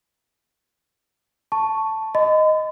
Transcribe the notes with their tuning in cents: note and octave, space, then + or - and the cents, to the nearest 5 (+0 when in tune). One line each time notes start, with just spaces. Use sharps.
A5 +0 C#6 +0
D#5 +0 B5 +45